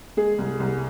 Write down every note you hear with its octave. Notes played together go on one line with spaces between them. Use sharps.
G#3 G#4
C2
C2